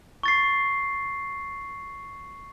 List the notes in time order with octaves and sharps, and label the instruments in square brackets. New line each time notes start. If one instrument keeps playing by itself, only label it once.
[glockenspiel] C#6 A6 C7